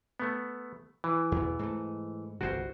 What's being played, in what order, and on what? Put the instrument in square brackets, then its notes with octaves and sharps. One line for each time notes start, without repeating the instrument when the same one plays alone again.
[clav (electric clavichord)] A3 B3
E3
[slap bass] E2 B2
G#2 A3
[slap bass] G1 C2 C3 [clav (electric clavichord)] F#4 C5